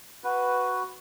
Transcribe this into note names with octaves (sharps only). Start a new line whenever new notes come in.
F#4 B4